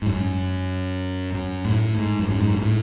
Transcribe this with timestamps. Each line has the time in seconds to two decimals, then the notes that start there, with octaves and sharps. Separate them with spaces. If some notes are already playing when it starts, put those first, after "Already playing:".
0.02 G#2
0.06 F#2
1.34 F#2
1.65 A2
1.98 G#2
2.19 F#2
2.30 F#2
2.40 G#2
2.56 G#2
2.62 A2